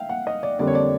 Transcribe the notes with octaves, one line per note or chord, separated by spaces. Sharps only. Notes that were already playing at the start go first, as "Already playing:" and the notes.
Already playing: E5 F5 G5
F#5
D#5
D5
F2 D3 G3 A#3 D5
C#5
D5